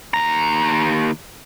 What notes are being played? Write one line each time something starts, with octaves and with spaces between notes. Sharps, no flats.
D#2 A#5